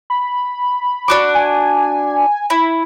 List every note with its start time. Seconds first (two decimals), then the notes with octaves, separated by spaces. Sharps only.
0.10 B5
1.08 D4 F#4 D6
1.35 G#5
2.50 E4